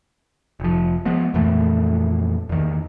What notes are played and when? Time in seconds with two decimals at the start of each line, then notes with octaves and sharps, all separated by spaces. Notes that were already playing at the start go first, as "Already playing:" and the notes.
0.60 F1 F3
1.05 F3 G#3 B3
1.34 F2 A#2 E3 A3
2.49 E2 D#3